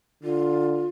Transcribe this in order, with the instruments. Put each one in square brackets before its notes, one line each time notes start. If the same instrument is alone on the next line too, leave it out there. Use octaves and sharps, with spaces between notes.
[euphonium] D3 [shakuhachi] F4